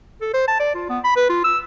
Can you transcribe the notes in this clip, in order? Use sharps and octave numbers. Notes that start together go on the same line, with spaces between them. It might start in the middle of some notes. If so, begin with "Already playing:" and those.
A4
C5
A5
D5
F4
B3
B5
B4
F4
E6